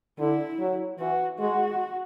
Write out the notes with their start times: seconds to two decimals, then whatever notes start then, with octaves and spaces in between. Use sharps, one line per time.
0.19 D3 E4
0.60 F#3
0.99 E3 F#4
1.39 G#3 F#4